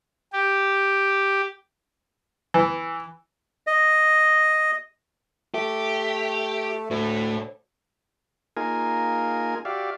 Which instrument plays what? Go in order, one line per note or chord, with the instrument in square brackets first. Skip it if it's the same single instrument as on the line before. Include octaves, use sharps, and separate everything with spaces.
[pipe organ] G4
[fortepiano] E3
[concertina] D#5
[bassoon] A3 [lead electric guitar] G4
[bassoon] D2 [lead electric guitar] A2
[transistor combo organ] A#3 D#4 F4 G#4 A#4 G#5
F#4 G4 D5 E5 F5